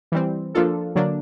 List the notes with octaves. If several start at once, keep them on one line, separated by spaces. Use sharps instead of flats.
E3 G3 C4
F3 A#3 D4 F4 A4
D3 F#3 A#3 D4